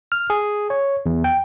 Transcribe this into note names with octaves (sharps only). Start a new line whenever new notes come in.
F6
G#4
C#5
E2
G5